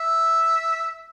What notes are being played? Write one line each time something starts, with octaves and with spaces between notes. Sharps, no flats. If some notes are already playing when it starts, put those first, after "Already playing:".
Already playing: E5